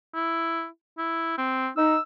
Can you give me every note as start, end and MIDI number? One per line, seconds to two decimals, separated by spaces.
0.14 0.67 64
0.98 1.35 64
1.38 1.69 60
1.77 1.96 63
1.77 2.01 88